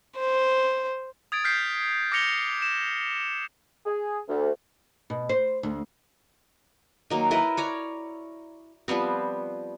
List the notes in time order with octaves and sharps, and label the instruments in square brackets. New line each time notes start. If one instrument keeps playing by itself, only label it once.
[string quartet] C5
[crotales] D#6 G#6 A6 D7
F6 G6 B6 C7
D6 F6 A#6 C#7 F7 G7
E7
[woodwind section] G#4
D2
[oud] B2
C5
D2
[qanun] D#3 F#3 A#3
E4 A#4 B4 D#5
C#5 D5 A#5
F3 G3 B3 C4